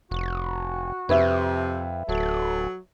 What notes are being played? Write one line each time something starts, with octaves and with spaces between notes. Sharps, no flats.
F1 F#4
F2 C3 B4 E5
D1 F#3 A4